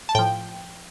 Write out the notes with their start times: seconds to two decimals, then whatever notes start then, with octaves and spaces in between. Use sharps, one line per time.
0.09 A5
0.15 A2 F3 G5